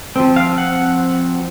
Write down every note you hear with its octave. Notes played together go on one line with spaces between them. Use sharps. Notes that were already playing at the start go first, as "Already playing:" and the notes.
F3 C4
F5
F#5